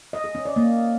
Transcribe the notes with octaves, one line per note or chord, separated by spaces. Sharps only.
D#5
G#4
C#4
D5
A#3